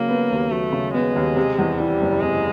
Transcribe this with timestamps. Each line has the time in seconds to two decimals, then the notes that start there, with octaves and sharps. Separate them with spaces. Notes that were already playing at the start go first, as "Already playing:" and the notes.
Already playing: C#3 F#3 A#3
0.09 B3
0.31 D#2
0.51 F#3 A3
0.72 C#3
0.94 G#3 B3
1.16 D#2
1.36 C3
1.59 E2
1.79 E3 G3
2.01 F#1
2.21 C3 G#3